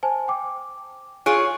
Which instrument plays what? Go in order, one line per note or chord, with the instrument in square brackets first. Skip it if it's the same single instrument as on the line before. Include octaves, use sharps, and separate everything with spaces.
[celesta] C5 G#5 A5
G5 D6
[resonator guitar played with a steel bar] F4 G#4 C#5 [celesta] G#5 F#6 D7